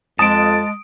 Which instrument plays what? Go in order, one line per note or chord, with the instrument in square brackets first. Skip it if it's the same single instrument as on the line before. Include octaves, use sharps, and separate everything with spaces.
[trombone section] F2 [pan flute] G#3 [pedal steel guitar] A5 [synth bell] D#6 D7